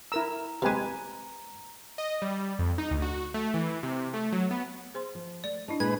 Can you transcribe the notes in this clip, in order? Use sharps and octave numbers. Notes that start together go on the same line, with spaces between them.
E4 A#4 A#5 E6
C3 G#3 G4 B4 G#5
D#5
G3
F2
D#4
D2
F#4
A3
E3
C3
A3
F#3
B3
G#4 C5 C6
F3
A3 D5
D4 E4 D#5 A5
A#2 G#3 B4 G#6